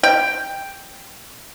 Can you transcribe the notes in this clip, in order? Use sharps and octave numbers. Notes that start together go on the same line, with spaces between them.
G5